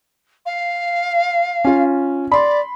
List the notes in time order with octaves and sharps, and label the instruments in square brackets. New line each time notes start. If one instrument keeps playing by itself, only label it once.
[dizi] F5
[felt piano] C#4 F4
[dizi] D5 [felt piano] B5 C6